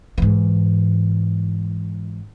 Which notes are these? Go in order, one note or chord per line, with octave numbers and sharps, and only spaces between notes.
G#2 E3